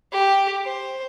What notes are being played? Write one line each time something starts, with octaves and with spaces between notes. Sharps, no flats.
G4
C5